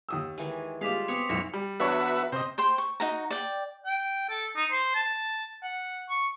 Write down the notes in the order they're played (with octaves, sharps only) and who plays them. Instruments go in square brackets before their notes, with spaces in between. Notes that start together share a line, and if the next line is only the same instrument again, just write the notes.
[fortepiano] D#2 D#6 E6
[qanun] D#3 E3 G#3
[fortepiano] G3 G#3 [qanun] F4 F5 [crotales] D6 B6 C7
[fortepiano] B3 [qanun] C4 C#5 [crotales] D#6 C#7 F7
[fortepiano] B1 G#2 E4 [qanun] C#5 [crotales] A#6 C#7 E7
[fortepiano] G3
[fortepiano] E2 D4 C#5 [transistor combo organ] F#4 B4 E5
[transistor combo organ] C3 [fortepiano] C5 D#5
[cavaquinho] C5 G5 C6
C#6
D#4 F#4 A#5
D5 G5
[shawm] G5
A4
D#4
C5
A5
F#5
C#6